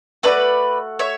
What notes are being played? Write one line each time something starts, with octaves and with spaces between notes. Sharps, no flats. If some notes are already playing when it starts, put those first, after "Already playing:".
A3 D4 F#4 B4 D5
C#5 E5